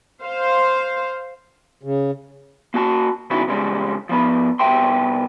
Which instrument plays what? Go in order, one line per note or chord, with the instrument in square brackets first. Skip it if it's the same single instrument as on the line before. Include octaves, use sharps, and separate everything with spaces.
[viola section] C5 F5
[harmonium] C#3
[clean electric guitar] A#3 F#4 A5
C#3 B3 C#4 D#4 E4 F#4
E2 C#3 G3 G#3
F3 B3 B4
C2 G#2 B3 E5 G5 C6